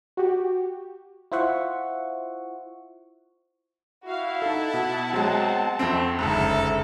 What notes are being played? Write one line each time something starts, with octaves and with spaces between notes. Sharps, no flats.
F#4 G4
E4 F4 C5 E5 F#5 C#6
E4 F#4 F5
D#4 A4 F#5 A5
B2
F#3 G#3 C4
F2 A3 C4 E6 C7
F#1 D2 G#2 A4